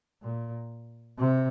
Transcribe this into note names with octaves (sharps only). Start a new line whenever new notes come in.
A#2
C3